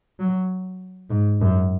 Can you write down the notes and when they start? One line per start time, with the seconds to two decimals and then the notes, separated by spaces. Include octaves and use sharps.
0.20 F#3
1.10 G#2
1.41 F#2